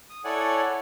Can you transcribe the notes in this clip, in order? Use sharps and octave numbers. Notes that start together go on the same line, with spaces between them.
D#6
E4 A4 C#5 D5 F#5 G#5